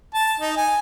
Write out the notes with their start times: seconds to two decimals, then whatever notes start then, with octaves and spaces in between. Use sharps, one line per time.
0.14 A5
0.40 D#4
0.57 G#5